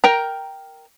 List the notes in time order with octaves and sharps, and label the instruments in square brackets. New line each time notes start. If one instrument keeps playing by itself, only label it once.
[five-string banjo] A#4 G5 A#5